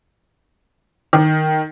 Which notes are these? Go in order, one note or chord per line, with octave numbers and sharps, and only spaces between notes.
D#3